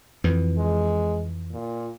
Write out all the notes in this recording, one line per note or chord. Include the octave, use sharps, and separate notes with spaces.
F2 E3
G#3
A#2